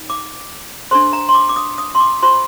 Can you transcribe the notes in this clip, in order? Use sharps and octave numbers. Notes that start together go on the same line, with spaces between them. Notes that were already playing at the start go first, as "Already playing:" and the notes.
Already playing: D#4
D6
D4 A4 C5 C6
A#5
C6
D6
D6
D#6
D#6
C6
D6
F4 C5 C6